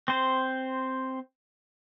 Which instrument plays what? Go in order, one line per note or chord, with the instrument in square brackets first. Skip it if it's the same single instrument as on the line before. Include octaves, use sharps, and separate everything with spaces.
[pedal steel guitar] C4 C5